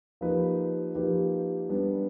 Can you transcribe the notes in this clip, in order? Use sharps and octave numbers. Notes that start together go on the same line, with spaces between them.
F3 A#3 D#4 G4 B4
F3 A#3 D#4 G4 B4
G3 B3 D4